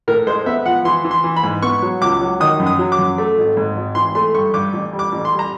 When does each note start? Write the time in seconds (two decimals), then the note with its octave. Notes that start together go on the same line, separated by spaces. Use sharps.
0.08 A2 A#4
0.27 G#3 C5
0.46 B3 E5
0.65 F3 F#5
0.85 E3 C6
1.04 E3
1.11 C6
1.24 E3
1.37 B5
1.43 G#2
1.62 B3 C#6
1.82 F#3
2.01 C#2 D6
2.21 F#3
2.40 D#3 D#6
2.60 F#2
2.67 D#6
2.79 F#3
2.92 D6
2.98 F#2
3.18 A3
3.37 G#1
3.57 G#2
3.76 G#1
3.95 E3 C6
4.15 A3 C6
4.34 G2 C#6
4.54 G2 D6
4.73 A1
4.93 G3
4.99 D6
5.12 A1
5.25 C6
5.32 G3
5.39 A#5